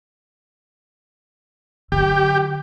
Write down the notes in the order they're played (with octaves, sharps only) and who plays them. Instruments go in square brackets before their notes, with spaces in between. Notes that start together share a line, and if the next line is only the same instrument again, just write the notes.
[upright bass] D3 F#3 [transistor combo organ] G4